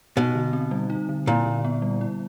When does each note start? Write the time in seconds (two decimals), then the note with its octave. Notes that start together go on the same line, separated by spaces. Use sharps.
0.17 B2 D#4
0.35 D3
0.53 C4
0.71 G3
0.90 D#4
1.09 D3
1.27 A#2 E4
1.45 D3
1.64 B3
1.82 G3
2.01 E4